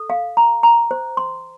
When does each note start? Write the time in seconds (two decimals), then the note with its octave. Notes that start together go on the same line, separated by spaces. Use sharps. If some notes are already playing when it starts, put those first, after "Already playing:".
Already playing: A4
0.10 F5
0.37 A#5
0.63 A#5
0.91 C5
1.17 C6